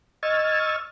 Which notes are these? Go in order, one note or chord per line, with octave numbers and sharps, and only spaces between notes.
D#5 C#6 E6 F6 G#6 A6